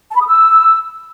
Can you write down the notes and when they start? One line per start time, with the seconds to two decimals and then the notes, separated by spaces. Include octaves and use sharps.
0.10 A5
0.16 B5
0.21 D#6
0.27 E6